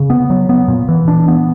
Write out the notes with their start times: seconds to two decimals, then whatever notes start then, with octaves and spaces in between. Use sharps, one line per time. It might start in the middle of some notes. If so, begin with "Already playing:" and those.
Already playing: C#3
0.10 B3
0.30 F#3
0.49 B3
0.68 A#2
0.89 E3
1.08 D4
1.28 B3